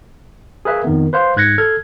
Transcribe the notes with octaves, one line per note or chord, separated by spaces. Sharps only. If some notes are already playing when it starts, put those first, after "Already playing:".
G#4 A#4 B4 E5 F5
F2 D#3 B3
B4 C5 F5 C6
G#2 F#6 G#6 A#6 C#7
A4 F6 G#6